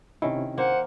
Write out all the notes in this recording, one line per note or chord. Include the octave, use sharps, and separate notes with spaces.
C3 D#3 C#4 E4
A#3 C5 F#5